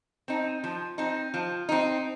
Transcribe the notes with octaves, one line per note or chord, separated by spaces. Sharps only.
C4 D#4
F3
C4 D#4
F3
C4 D#4